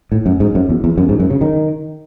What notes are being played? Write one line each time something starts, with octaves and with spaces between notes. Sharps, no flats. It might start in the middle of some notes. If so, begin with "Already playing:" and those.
A2
F#2
G#2
F#2
E2
E2
F#2
G#2
F#2
C#3
D#3